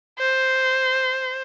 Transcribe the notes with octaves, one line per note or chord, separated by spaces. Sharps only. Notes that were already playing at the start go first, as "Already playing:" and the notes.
C5